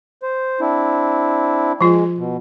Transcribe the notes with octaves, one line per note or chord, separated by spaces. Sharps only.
C5
C4 D4 E4
F3 G#3 F4
B2